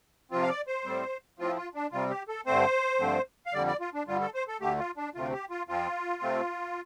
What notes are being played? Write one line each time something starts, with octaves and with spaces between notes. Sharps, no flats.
C3 F3 C4 F4
F5
D5
C5
A2 G3 C4
A2 F3 C4 F4
F4
D4
C3 G3 C4 F4
G4
A4
G2 D3 A3 C4 C5
G2 D3 F3 A3 C4
F5
F2 D3 G3 D5
D5
F4
D4
G2 D3 G3 F4
A4
C5
A4
D2 D3 A3 G4
F4
D4
D2 C3 A3 C4 F4
G4
F4
F2 F3 C4 F4
C3 A3 C4